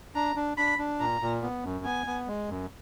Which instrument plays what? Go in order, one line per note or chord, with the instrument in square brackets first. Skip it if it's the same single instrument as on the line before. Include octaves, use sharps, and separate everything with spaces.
[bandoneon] D4 [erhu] A#5
[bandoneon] D4
[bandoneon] D4 [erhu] B5
[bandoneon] D4
[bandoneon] A#2 [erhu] A#5
[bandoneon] A#2
B3
F#2
[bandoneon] B3 [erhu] G#5
[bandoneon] B3
G#3
F#2